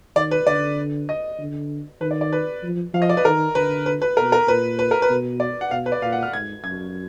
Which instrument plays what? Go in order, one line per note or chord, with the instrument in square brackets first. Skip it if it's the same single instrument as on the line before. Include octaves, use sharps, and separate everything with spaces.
[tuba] D#3 [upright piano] D5
[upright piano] B4
[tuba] D3 [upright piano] D5
[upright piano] D#5
[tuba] D3
[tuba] D#3 [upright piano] B4
[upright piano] D5
D5
B4
[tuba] F3
[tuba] F3 [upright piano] F5
[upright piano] D#5
D5
B4
[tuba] D#3 [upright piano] A#4
[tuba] D3 [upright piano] B4
[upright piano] B4
B4
[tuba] B2 [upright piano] A#4
[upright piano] A#4
[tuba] A#2 [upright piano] B4
[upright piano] B4
A#4
B4
[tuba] B2
[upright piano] D5
F#5
[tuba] B2 [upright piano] F5
[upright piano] B4
D5
[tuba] A#2 [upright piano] F5
[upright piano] F#5
F6
[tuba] G#2 [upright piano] G#6
[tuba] F#2 [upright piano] G#6